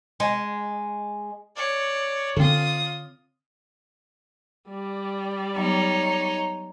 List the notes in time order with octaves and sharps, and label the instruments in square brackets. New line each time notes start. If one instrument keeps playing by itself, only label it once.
[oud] G#3
[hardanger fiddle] C#5 D5
[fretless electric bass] D3 C4 [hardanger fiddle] F4 D#6
[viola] G3 D5
[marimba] F#3 B3 [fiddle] D#4 C#5